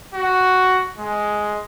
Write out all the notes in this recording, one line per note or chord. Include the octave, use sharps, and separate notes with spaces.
F#4
G#3